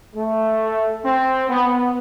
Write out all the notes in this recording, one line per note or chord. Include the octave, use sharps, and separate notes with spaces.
A3
C4
B3